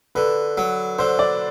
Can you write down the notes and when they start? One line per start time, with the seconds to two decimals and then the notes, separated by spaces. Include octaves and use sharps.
0.15 D3 B4
0.58 F#3
0.99 D3 C5
1.19 D5